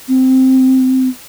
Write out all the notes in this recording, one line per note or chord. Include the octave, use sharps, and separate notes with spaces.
C4